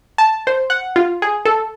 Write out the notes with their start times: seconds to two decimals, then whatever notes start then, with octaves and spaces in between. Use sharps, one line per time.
0.18 A5
0.47 C5
0.70 F#5
0.96 F4
1.22 G#4
1.45 A4